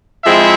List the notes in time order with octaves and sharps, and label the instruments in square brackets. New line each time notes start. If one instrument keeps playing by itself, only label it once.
[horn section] F3 G#3 C4 E4 E5